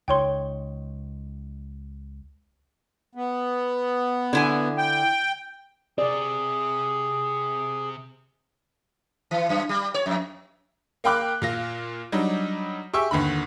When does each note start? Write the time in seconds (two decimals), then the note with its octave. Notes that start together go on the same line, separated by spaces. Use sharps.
0.08 C#2 D#4 C#5 G5 C6
3.15 B3
4.33 D3 E4 G#5
4.78 G5
5.98 C3 C4 G#4 D5
9.31 E3
9.49 F#2
9.69 G3
9.94 C#5
10.06 F2
11.04 A#3 F5 G5 B5 D6 F#6
11.42 A#2 F4 A#6
12.12 F#3 G3 D4 D#4
12.94 G4 G#4 E5 C#6 E6
13.11 G1 D#2 D3 B5